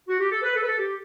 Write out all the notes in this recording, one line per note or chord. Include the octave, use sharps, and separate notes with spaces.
F#4
G4
A4
B4
A4
B4
A4
G4